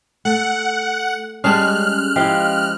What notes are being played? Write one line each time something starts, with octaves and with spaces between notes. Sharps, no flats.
A3 F#5
G3 G#3 C#4 G#4 D5 A5 F6 F#6
F3 E4 G4 D#5 F5